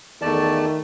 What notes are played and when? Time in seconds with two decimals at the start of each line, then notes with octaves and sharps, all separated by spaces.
0.22 E2 D#3 A3 D5 A5